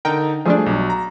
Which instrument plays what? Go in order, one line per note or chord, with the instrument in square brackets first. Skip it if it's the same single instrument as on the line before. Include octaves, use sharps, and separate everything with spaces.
[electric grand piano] D3 D#4 A#4 [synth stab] G5
[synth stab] F3 G3 D4 [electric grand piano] A3 G#4
[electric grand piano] B1 F#3
A#5